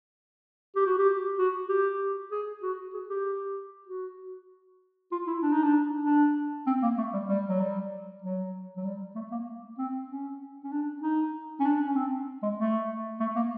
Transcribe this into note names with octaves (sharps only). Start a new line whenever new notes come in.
G4
F#4
G4
F#4
G4
G#4
F#4
G#4
G4
F#4
F4
E4
D4
D#4
D4
D4
C4
A#3
A3
G3
G3
F#3
G3
F#3
F#3
G3
A3
A#3
C4
C#4
C#4
D4
D#4
C#4
D4
C#4
C4
G#3
A3
A3
A#3